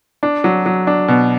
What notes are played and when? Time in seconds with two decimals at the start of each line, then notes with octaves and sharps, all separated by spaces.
0.23 D4
0.44 F#3
0.66 F#3
0.87 D4
1.08 B2